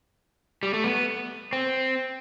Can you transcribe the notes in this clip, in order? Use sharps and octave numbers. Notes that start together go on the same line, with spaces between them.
G3
A3
B3
C4